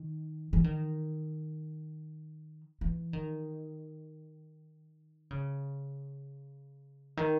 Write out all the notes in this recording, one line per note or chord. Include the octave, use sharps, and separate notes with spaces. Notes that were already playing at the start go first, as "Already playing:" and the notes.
Already playing: D#3
E3
D#3
E3
D#3
C#3
D#3